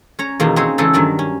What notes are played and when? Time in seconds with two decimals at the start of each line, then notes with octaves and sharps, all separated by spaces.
0.19 C#4 C#5 A#5
0.40 E2 B2 D#3 A#3 D#4
0.56 C4 C#4 D#4 F#4 G#4
0.78 C#3 E3 G#3 A3 D#4 A4
0.93 G2 D#3 F#3 A#4 D5
1.19 C#4